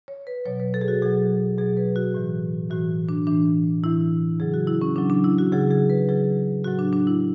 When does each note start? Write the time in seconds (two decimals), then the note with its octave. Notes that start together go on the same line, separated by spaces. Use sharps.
0.08 C#5
0.27 B4
0.45 B2 F#3 C#5
0.60 B4
0.74 A4
0.81 G#4
0.88 F#4
1.02 B2 F#3 G#4
1.58 B2 F#3 G#4
1.77 B4
1.96 F#4
2.14 A2 E3
2.71 A2 E3 F#4
3.09 D4
3.27 A2 E3 D4
3.84 A2 E3 E4
4.40 C#3 F#3 G#4
4.54 F#4
4.67 E4
4.81 C#4
4.96 C#3 F#3 D4
5.10 D4
5.24 E4
5.38 F#4
5.52 C#3 F#3 G#4
5.71 G#4
5.90 B4
6.09 C#3 F#3 G#4
6.64 A2 F#3 F#4
6.79 D4
6.93 D4
7.07 E4